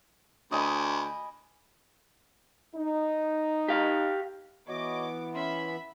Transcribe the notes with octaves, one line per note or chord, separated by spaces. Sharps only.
D2 D#5 G#5 B5
D#4
G4 F5
E3 B3 F#4 C#5 D#5 D6
C#4 E5 B5 C6